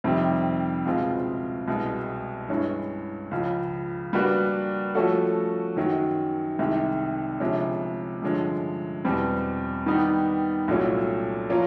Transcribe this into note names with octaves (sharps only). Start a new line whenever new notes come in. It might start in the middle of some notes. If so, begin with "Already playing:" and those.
F2 C3 D#3 G3 C4
C#2 B2 G#3 C4 F4
C2 B2 G#3
G2 E3 G#3 C#4
C#2 C#3 F3
G3 A#3 D4 F#4 B4
F3 A3 C#4 F#4 A4
F#2 D#3 F#3
C2 C3 D#3 G#3
D2 C3 F3 G#3 C#4
G2 D3 F3 G#3 C#4
E2 B2 G3 C4
D#3 G3 B3 D#4 G4
C2 A#2 F#3 A3 C#4
F3 A#3 C#4 F4 A#4